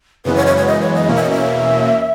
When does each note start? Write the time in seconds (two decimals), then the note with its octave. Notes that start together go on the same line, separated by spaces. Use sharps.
0.25 F#2 C#3 E3 G#3 B3 B4
0.36 C#5
0.46 C#5
0.57 C#5
0.67 D#5
0.81 C#5
0.95 D#5
1.09 E2 B2 A#3 C#4
1.16 E5
1.23 D#5
1.31 E5